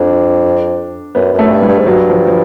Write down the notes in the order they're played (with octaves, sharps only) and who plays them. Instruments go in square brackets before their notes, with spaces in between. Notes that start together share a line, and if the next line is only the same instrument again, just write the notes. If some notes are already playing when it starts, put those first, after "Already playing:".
Already playing: [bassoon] F2 [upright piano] D4
[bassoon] F#2 [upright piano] B3
[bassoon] F#2
[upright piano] A3
[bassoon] G2
[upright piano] G3
[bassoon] G2
G#2
[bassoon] G2 [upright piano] F#3
[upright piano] F3
F3